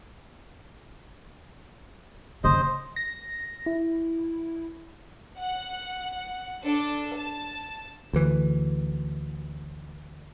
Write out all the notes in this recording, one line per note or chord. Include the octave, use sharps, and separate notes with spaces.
F#2 C#3 C5 D#5
A#6
E4
F#5
D4 A4
A5
D2 E3